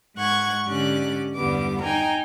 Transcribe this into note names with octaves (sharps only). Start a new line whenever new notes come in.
G#2 F#5 C#6 G#6
G#2 D3 C#4 G4 D5 F#6
E2 G2 D3 G3 B3 D6
D#4 G5 G#5 A#5